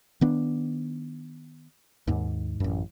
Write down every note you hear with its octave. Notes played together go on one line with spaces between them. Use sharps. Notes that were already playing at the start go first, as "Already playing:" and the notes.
D#3 B3 D4
D#2 G#2
A1 F#2